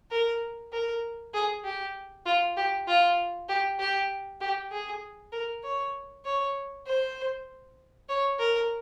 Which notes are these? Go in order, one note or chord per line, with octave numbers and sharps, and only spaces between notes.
A#4
A#4
G#4
G4
F4
G4
F4
G4
G4
G4
G#4
A#4
C#5
C#5
C5
C#5
A#4